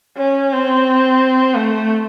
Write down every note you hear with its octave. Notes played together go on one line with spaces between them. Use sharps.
C#4
C4
A3